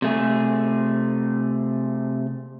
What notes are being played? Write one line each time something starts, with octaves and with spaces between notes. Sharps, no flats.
C3 A3 G#4